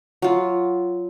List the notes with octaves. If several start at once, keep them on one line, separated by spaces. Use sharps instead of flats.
F#3 F4